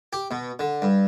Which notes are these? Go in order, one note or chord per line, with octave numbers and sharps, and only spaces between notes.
G4
B2
D3
G2